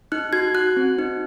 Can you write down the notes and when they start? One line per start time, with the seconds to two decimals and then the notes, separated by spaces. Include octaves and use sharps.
0.12 D#4 F#6
0.33 F#4 G#6
0.54 F#4 F#6
0.77 C4
0.99 D#4